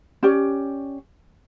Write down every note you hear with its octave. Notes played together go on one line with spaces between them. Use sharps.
C#4 G4 D5